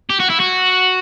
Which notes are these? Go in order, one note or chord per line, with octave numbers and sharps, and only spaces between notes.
G4
F#4
E4
F#4